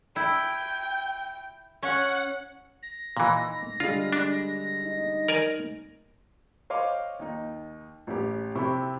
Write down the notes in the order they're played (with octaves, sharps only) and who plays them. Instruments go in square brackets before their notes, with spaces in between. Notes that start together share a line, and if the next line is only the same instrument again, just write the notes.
[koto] E4 [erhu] G5
[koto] C#4 [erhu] F#5
[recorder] A#6
[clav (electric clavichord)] A#2 E3 [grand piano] D#4
[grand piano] D3 G3 G#3 [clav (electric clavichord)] F4
[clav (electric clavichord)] D4
[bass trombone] D#4
[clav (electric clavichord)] A#4 D5 G#5
[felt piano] C5 C#5 D#5 F5 C6 D6
D#2 D#4
A1 C#4 G4
C3 C4 E4 G4 B5 C#6